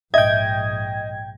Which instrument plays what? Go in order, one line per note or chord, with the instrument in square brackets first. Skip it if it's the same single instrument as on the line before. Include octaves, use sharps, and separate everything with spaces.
[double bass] A#1 G#2 [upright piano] D#5 [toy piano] E5 [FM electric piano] G5 G#6